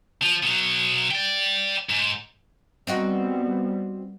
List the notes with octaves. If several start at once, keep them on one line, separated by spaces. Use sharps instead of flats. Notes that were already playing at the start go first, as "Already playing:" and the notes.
F3
B2 F#3
D5 G5
G#2
G3 B3 C4 D#4 F#4